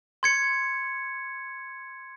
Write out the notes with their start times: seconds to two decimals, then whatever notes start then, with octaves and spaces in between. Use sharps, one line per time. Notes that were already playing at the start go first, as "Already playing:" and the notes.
0.23 C6 G#6 C#7